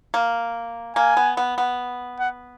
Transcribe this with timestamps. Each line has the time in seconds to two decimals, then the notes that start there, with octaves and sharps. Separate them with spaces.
0.14 A#3
0.96 A#3 G#5
1.17 B3
1.37 B3
1.58 B3
2.20 F#5